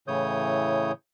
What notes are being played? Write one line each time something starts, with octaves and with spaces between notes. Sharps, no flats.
A2 C#3 E3 C#5 D#6 G6